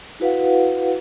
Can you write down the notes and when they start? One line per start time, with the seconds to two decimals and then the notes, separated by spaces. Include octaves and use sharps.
0.20 E4 F#4 B4 F5 F#5